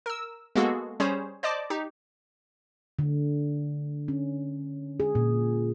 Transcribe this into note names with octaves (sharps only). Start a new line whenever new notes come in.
A#4 E6
G#3 A#3 B3 F#4 G#4 A4
G3 C#4 G#4 C5 C#5
C5 D5 D#5 A5 D6
D#4 G4
D3
C#4
G#4
A#2